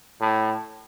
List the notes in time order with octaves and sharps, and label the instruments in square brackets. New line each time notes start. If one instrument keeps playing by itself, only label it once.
[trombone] A2